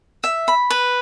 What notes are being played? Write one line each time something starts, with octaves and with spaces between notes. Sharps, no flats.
E5
B5
B4